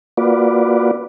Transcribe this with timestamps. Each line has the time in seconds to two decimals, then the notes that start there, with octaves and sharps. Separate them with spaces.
0.17 A#3 F4 F#4 B4 D5